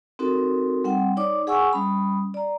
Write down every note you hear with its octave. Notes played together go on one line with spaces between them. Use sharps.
C4 D#4 F#4 A4 A#4
G3 C4 F#5 G5
D#4 C#5 D5 D6
G#4 F#5 G#5 C#6 E6
G3 C#4 B5 D#6
D5 A#5